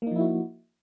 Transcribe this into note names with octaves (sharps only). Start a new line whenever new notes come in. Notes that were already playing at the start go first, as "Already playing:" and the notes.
F3 A#3 D#4 E4 F#4